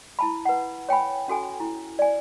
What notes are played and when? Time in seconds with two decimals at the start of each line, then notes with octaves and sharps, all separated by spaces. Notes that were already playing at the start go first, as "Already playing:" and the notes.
0.19 E4 A5 B5
0.45 B4 F#5
0.89 C#5 G5 G#5 B5
1.28 C#4 F#4 A4 G#5
1.60 E4
1.99 D5 G#5